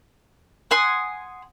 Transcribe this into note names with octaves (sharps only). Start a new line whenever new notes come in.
F#5 G#5 C6 D#6